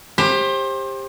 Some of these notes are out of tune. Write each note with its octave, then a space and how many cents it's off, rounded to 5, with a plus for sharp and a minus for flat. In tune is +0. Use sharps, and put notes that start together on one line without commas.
G4 +20 C5 +30